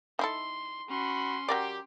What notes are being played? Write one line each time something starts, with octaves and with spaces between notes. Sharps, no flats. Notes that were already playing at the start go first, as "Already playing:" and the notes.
D#4 E4 A4 C6
C#4 F#4 B5 C6
F#3 G4 A#4 D5